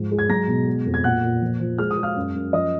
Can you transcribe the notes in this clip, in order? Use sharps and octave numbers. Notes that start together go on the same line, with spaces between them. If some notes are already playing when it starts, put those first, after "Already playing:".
Already playing: G#2 F3
G#3
G#6
F#3 A#5 A#6
B2
G#3
F2
G#6
A#2 F#5 F#6
A#2
F3
F3
G#3 F6
D#6
G#3
F5 F6
F#2
F#2
F3 D#5 D#6